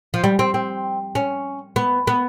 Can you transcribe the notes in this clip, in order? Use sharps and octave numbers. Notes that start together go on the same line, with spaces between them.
F3
G3
C4
C4
C#4
B3
B3